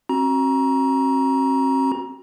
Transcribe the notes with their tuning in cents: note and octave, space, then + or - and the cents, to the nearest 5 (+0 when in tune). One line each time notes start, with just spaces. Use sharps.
C4 +40 F#4 +0 A#5 +25